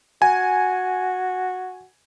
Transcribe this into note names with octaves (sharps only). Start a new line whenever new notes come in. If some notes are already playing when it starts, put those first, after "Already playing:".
F#4 G#5